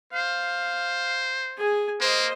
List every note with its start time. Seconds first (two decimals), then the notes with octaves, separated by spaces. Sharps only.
0.13 C5 F5
1.58 G#4 G#5
2.01 A#3 C5 D#5